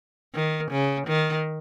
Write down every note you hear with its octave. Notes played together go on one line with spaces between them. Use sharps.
D#3
C#3
D#3